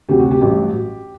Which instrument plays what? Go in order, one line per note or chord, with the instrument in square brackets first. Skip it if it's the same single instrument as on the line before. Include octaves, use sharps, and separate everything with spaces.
[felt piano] D2 C3 F#3 G4
F#4
G4
A1 G2 F#3